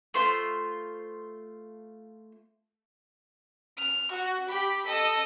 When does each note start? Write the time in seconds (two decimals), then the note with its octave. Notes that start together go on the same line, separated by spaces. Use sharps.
0.14 A3 F4 C5 C6
3.77 F6
4.12 F#4
4.48 G4 B5
4.86 A4 D#5